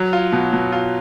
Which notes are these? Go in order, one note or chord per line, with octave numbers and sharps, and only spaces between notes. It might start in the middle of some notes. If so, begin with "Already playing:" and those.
Already playing: F#3
F4
B2
B2
F4